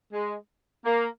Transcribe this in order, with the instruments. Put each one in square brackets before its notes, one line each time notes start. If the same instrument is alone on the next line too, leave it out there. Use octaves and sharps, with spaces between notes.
[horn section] G#3
A#3